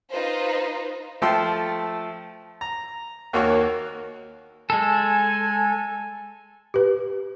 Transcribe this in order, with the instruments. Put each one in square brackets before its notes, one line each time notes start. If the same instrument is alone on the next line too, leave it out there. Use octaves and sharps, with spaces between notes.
[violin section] D#4 F4 B4 C5
[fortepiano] F3 A3 A4 G5 A5 C6
A#5
D#2 A#3 F#4 C#5 C#6
[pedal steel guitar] G#3 A4 [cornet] G#5
[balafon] G4 B4